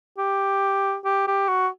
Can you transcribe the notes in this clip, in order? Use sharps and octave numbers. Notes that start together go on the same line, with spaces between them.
G4
G4
G4
F#4